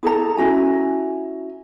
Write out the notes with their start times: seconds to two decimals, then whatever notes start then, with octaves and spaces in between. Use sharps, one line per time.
0.03 E4 G#4 A4 A#5
0.37 C#4 E4 F#4 G#5